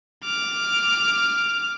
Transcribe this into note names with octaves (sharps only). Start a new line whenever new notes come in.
D6 F6